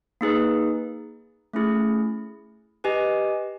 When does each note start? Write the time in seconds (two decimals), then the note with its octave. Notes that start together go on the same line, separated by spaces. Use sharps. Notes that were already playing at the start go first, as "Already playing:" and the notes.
0.21 A#3 D#4 G#4 B4
1.53 A3 C#4 E4 G#4
2.84 G4 B4 D#5 G#5